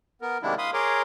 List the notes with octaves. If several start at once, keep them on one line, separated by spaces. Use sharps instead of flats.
B3 A#4
C3 D#3 G#3 A#3 D4 E4
F5 B5 C6 D#6
G#4 A#4 C#5 A#5 C6 D6